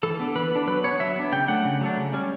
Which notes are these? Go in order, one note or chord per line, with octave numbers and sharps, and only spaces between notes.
E3 A4
B3 D4
E3 B4
B3 D4
F#3 B4
B3 D4 C#5
F#3 E5
B3 D4
C#3 G5
F#3 A3 D4 F#5
C#3
F#3 A3 D4
C#3
G3 C#4